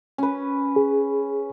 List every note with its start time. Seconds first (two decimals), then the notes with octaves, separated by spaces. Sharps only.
0.18 C#4 B4
0.76 G#4